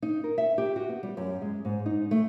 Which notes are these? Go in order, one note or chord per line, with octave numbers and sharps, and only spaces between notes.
D#4
A#4
E5
G4
F#4
B3
G3
F#2
G#3
G#2
D#4
A3